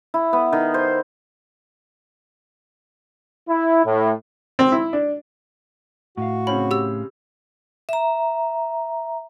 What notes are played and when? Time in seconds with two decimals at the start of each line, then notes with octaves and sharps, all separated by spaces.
0.14 E4
0.33 B3
0.53 D#3
0.74 C5
3.49 E4
3.85 A2
4.59 C4
4.72 E4
4.93 D4
6.17 A2 F#4 F5
6.47 C#3 C4 C#4 B5
6.71 G4 E6
7.89 E5 A#5